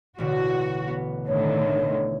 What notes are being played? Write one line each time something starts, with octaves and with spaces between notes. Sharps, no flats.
A1 B2 D3 F#4
B3
A2 D3 D#3 C#5